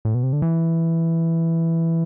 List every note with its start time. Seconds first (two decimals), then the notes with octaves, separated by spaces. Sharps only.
0.05 A2
0.15 B2
0.23 C3
0.33 D3
0.42 E3